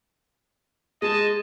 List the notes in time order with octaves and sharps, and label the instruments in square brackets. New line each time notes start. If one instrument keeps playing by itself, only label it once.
[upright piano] G#3 [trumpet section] D#5 G#5 A5